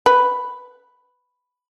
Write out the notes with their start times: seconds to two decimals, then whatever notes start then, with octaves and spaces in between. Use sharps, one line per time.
0.06 B4